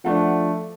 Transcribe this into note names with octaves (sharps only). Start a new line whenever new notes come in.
F3 A3 D4 F#5